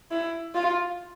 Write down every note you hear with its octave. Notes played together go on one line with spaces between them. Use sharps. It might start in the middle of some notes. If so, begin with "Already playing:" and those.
E4
F4